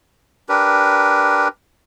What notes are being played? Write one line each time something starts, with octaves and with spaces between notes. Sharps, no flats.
D4 G4 A#4 B4